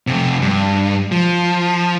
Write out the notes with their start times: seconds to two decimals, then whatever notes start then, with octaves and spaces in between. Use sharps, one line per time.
0.07 F2 C3
0.42 G2
1.12 F3